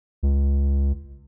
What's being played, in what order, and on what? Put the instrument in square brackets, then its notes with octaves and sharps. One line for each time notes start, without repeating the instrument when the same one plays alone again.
[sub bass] C#2